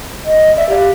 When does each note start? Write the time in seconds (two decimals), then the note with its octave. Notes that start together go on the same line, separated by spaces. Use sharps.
0.25 D#5
0.57 D5 E5
0.69 G4 F5